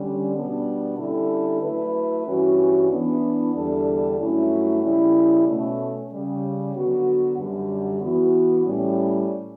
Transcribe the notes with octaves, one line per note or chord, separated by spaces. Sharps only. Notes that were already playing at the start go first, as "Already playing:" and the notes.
Already playing: D3 G3 C#4
B2 G3 B3 D4
D3 G3 C#4 E4 A4
F#3 A3 E4 B4
G2 E3 G3 C#4 F#4
E3 B3 D4
E2 D3 G3 D4 A4
G2 F#3 A3 C#4 E4
C#3 G3 C#4 E4 A4
B2 A3 C#4
C#3 G3 C#4
D3 F#3 B3 F#4
F#2 D3 G3
E3 B3 F#4
A2 G3 C#4